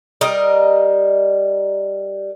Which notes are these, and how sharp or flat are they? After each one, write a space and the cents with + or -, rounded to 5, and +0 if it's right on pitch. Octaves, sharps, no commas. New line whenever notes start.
G3 +0 A#4 +10 D#5 +0